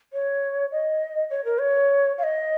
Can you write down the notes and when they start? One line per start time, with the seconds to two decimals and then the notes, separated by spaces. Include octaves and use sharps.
0.13 C#5
0.72 D#5
1.30 C#5
1.45 A#4
1.60 C#5
2.18 F5
2.23 D#5